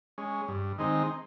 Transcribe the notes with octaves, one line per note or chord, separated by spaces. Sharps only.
G#3 C#4
G2
D#3 G#3 C4 D#4